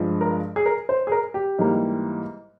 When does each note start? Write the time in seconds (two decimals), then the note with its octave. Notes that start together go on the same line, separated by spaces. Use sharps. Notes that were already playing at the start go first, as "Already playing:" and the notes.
Already playing: G2 F3 G#3
0.21 A#4
0.56 G#4
0.66 A#4
0.89 C5
1.07 G#4
1.12 A#4
1.34 G4
1.58 G#2 E3 G3 A#3